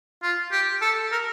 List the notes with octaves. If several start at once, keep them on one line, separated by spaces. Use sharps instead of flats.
F4
G4
A4
A#4